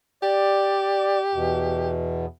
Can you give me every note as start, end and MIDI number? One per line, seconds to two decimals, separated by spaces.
0.23 1.92 67
0.23 1.19 74
1.34 2.26 40
1.34 2.26 47